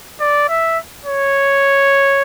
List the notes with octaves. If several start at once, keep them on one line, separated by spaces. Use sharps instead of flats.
D5
E5
C#5